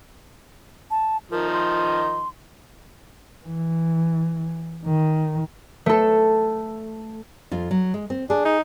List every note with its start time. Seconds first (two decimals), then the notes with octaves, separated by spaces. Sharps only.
0.91 A5
1.31 D#3 F3 D#4 A#4
1.53 C6
3.46 E3
4.86 D#3
5.86 A3 A4
7.51 F2 F4
7.71 F#3
7.94 G#3
8.10 C4
8.30 D4 G#4
8.45 D#4